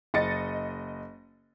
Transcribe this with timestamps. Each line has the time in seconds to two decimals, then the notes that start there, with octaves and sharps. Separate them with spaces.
0.14 F#1 D#5 A6 C#7